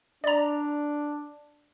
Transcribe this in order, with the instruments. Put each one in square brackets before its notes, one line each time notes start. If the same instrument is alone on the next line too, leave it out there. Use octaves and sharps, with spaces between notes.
[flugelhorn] D4 [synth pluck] D5 A#5